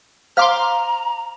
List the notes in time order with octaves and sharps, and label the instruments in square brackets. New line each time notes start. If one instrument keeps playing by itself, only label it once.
[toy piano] C5 F5 [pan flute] A#5 [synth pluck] C6 D6 F6